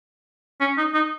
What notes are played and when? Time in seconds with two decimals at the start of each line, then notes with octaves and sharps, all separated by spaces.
0.61 C#4
0.78 D#4
0.94 D#4